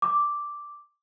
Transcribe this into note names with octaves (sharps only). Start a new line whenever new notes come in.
D6